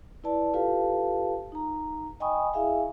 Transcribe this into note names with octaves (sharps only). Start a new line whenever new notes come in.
E4 B4 D5 A5
F4 G4 A4 B4 F5 A5
D#4 A#5
D#5 G5 G#5 B5 C#6 D#6
E4 G#4 E5 F5 G#5